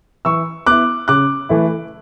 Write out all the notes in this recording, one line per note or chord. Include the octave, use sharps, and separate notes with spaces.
E3 C#6 E6
B3 E4 D6 F#6
C#3 D6 F#6
E3 A3 E4